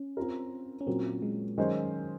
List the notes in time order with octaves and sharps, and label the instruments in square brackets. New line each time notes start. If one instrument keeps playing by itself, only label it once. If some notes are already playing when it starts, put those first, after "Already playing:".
Already playing: [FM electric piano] C#4
[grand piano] C4 F4 A#4
[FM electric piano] C#4
[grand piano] A#2 F#3 A#3 [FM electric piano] C4
[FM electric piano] G#3
[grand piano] D#3 G#3 C#4 G#4 C5 [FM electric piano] F#3